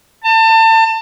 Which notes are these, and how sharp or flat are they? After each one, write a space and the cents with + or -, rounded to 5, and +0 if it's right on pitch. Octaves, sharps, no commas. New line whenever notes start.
A5 +30